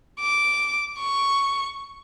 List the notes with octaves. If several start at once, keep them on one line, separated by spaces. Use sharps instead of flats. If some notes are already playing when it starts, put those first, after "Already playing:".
D6
C#6